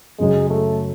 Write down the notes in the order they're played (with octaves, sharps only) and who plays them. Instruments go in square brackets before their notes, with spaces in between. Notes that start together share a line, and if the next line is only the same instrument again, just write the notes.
[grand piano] F#2 C#3 F#3 [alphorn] G#3
[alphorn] A3